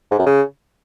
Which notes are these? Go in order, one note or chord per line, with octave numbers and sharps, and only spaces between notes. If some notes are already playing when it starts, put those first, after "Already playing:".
G#2
F#2
C#3